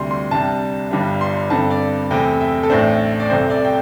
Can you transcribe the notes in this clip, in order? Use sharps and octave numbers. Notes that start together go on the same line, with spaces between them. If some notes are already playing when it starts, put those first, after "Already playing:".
Already playing: D2 C3 G3 C6
C6
C2 C3 G3 D4 A5
G1 G2 G3 D4
C6
G2 D3 C4 A5
D5
E2 C3 A3 C4 G5
E5
A4
A1 A2 A3 D4 C5
D5
C2 C3 A3 C4 C5
D5
G5